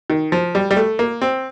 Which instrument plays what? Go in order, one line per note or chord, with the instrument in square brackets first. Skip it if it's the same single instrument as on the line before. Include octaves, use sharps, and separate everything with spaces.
[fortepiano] D#3
F3
G3
G3
A3
A#3
C4